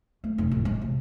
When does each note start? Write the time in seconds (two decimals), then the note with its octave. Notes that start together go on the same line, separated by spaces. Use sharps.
0.24 A3
0.38 F1
0.51 A1
0.65 G#3
0.82 C3